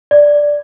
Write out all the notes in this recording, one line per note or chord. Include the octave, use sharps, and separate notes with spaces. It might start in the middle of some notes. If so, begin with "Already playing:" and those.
D5